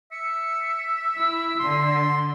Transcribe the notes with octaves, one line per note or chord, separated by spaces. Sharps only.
E5 C#7
E4 E6
D3 C6